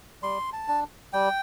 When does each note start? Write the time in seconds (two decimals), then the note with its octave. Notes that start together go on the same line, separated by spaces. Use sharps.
0.23 G3 C6
0.53 A5
0.68 D4
1.13 G3 G5